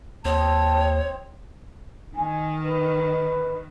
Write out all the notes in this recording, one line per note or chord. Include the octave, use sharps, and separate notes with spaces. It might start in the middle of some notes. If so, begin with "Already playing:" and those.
D#2 C4 G4 C#5 D#5 A5
D#3 G#5
B4